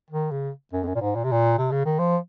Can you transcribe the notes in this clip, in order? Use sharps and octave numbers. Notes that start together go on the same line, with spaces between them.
D#3
C#3
F#2
F2
F#2
A#2
G#2
A#2
C3
A#2
C3
C#3
D#3
F3